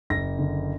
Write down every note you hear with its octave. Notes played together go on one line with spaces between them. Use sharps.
F#1 A#6
D3